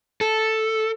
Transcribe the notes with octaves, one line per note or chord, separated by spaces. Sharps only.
A4